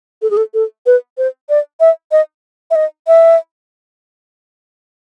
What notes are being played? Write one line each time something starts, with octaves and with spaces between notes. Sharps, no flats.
A4
G#4
A4
A4
B4
C5
D5
E5
D#5
E5
D#5
E5